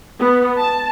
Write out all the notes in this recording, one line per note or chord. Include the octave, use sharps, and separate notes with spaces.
B3
A5